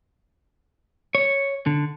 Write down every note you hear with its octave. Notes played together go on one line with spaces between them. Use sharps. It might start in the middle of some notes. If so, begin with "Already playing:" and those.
C#5
D3